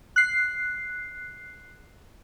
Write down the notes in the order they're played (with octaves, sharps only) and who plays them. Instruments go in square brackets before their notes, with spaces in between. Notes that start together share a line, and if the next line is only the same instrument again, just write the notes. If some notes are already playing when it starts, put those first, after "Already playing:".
[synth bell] F#6 C7